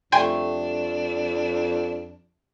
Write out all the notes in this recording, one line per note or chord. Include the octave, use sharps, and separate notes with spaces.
F2 G3 A3 D4 D#5 G5 G#5 C6